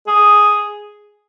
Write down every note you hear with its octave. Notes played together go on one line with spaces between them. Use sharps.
G#4